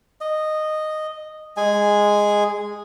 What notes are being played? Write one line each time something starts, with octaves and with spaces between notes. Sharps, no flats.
D#5
G#3 G#4 G#5